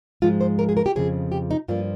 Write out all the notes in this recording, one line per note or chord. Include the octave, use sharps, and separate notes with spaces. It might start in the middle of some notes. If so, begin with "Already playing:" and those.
G#2 F3 G#3 F4
C5
A#4
G#4
A#4
G4
F2 C#3 F3 G#4
G4
D#4
G2 F3 A#3 F4